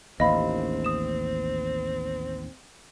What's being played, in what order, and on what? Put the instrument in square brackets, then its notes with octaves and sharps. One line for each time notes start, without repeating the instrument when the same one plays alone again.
[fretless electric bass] A1 D#2 [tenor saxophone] C4 [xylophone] D#5 F5 B5
[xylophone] D#6 E7